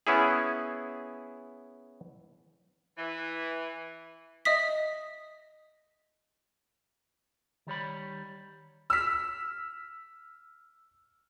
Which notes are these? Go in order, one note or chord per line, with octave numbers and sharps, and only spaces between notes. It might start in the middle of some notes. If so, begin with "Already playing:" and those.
B3 C#4 E4 G#4
E3
D#5 E5 D#6 B6
D#3 G3 C#5 B5
E6 F6 B6